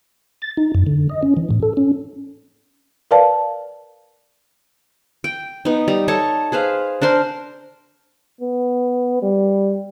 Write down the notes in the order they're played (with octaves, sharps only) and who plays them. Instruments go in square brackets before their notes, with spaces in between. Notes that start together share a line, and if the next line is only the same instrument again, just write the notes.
[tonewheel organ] A6
D#4
F#2
D3
D#5
C#4
E3
A2
A4
C#4
[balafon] A#4 B4 D5 F5 A5
[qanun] G5
B3 D#4
G3 A#5
A4 C#5 D#5 A5
G#4 B4 C5 F5
D4 A#4 C5 C6
[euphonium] B3
G3